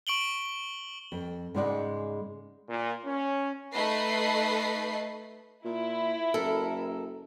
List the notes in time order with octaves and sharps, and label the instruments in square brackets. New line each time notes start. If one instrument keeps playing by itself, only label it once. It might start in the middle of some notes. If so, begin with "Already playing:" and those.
[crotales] C#6 D7 F#7 G7
[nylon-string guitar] F2
G#2 C#3 G#3 D#4 D5 F#5
[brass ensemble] A#2
C#4
[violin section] A3 D#4 B4 D#5 B5 C7
[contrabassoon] A#2 [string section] E4
[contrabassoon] F#1 [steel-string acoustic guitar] A4 A#4